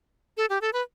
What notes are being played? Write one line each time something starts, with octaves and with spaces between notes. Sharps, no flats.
A4
G4
A4
B4